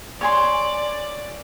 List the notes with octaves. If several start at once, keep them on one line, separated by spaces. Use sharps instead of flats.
C#5 D5 G#5 C6